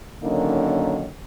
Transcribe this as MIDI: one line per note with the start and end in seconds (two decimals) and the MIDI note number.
0.23 1.07 50
0.23 1.07 51
0.23 1.07 54
0.23 1.07 58
0.23 1.07 61
0.23 1.07 63